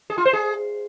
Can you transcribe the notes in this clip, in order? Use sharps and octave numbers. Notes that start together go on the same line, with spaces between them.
G#4
F4
C5
G#4